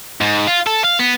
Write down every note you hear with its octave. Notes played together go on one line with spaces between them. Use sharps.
G#2
F4
A4
F5
B3